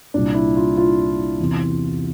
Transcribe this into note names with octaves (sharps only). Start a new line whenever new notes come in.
C2 A#2 D4
E4
F4
F4
E2 C3 E3